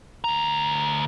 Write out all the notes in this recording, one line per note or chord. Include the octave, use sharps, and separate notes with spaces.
D2 A#5